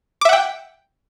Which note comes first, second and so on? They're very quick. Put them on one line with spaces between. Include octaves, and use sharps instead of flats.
D6 E5 F#5 G5